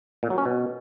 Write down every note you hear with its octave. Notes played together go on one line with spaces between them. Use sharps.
A#2
F#3
C#4
B2